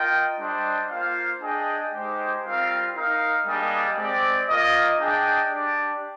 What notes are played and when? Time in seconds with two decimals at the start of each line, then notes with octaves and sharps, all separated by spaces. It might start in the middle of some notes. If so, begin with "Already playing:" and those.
Already playing: F4 A#4 D#5 G5
0.38 G3 D4 G4 C5 D#5
0.89 A#3 F4 C5 F5
1.41 D4 G#4 D#5 G5
1.92 G#3 D#4 G4 C5
2.44 G3 C4 F4 A#4 F5
2.94 D#4 A#4 F5
3.46 G3 A#3 D4 G#4 D#5
3.97 G#3 C4 G4 D5
4.49 A#3 F4 A#4 D#5
5.00 D4 G#4 D#5 G5
5.51 D4 G4 D5